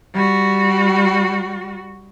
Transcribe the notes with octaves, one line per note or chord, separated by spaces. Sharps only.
G3 F#4